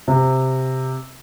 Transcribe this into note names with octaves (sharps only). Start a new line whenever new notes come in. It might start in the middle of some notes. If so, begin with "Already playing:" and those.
C3